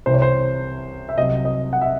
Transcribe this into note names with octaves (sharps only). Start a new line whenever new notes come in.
C2 C3 E3 C5
C#5
C5
E5
C2 C3 F#3 D#5
D#5
F#5
E5